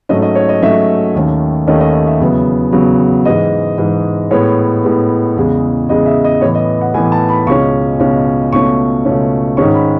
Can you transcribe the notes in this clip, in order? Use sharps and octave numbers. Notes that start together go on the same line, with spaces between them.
G#2 F#3 A3 C#4 D#5
D#5
C#5
D#5
G#2 F#3 A3 C#4 E5
D#2 D#3 A3 C#4
D#2 D#3 A3 C#4 D#5
D#5
D#5
E5
E2 C#3 F#3 B3
E2 C#3 F#3 B3
G#2 E3 G#3 D#5
G#2 E3 G#3
A2 G#3 B3 C#5
A2 G#3 B3
E2 C#3 G#3
E2 C#3 G#3 D#5
E5
D#5
A2 E3 B3 C#5
D#5
F#5
A2 E3 B3 G#5
A5
B5
C#2 B2 G#3 C#4 C#6
C#2 B2 G#3 C#4
C#2 B2 A3 C#4 C#6
C#2 B2 A3 C#4
G#2 D#3 G#3 C#4 C#6
B5